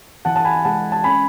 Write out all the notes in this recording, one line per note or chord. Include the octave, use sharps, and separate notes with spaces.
E3 F#5 A5
A5
G#5 B5
G#3 F#5 A5
A5
C#4 G#5 B5